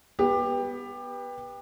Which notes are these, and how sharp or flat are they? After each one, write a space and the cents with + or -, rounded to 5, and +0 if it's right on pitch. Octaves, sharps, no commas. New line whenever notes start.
B3 -10 G4 +20